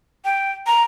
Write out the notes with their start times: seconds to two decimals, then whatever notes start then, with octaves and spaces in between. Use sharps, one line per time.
0.25 G5
0.67 A#5